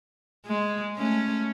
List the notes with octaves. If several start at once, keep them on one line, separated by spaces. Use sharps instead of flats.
G#3
A3 C#4